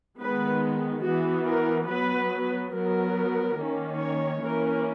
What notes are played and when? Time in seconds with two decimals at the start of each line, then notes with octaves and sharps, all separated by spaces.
0.19 D#3 G#3 B3 B4
1.04 E3 B3 F#4
1.47 A#4
1.89 F#3 B3 B4
2.73 F#3 B3 A#4
3.58 D#3 A#3 C#4
4.00 C#5
4.43 E3 A#3 C#4 A#4